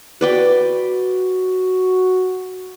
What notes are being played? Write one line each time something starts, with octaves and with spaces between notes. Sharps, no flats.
F#4 B4 D5 G5